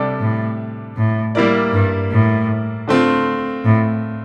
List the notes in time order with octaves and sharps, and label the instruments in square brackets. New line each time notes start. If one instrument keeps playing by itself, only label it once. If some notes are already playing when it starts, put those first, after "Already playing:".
Already playing: [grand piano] C3 G3 D4 A4 D5
[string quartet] A2
A2
[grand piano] G3 A#3 E4 A#4 D5
[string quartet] G2
A2
[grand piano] D3 A3 C4 F4
[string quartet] A2